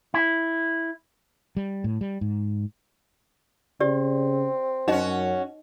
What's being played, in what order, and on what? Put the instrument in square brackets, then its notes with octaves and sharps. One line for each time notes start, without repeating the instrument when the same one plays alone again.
[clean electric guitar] E4
[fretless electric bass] G3
A2
G3
G#2
[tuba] C#3 [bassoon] C4 [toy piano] G4 D5
[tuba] F#2 [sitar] C#4 F#4 [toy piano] D#4 D#5